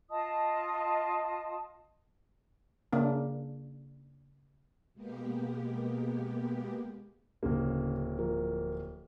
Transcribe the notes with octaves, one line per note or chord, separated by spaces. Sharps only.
F4 D#5 A5 D#6
C#3 A#3 D4
B2 G#3 A#3 B3 G4
D1 C#3 A#3
F3 A#4